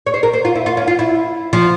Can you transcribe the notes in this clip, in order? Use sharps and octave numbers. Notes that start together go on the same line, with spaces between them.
C#5
C5
A#4
C5
F4
E4
F4
C#4
F4
E4
F3